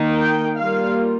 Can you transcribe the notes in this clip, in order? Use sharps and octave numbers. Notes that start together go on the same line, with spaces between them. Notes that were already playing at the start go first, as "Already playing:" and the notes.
Already playing: D#3 A#3 D#4
G5
G3 A#3 F4 F5